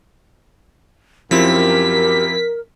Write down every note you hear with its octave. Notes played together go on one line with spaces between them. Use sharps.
F#2 F3 C4 E4 G4 A#4 B6